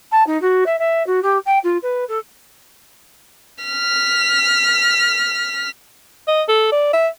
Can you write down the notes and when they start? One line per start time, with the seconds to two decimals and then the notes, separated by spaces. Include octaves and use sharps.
0.12 A5
0.27 D#4
0.42 F#4
0.66 E5
0.79 E5
1.07 F#4
1.23 G4
1.46 G5
1.64 F4
1.83 B4
2.09 A4
3.64 F6 B6
6.28 D#5
6.49 A4
6.72 D5
6.93 E5